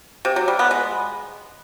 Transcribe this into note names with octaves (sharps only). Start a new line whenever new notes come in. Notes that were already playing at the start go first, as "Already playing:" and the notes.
C3
F#3
G3
B3
G#3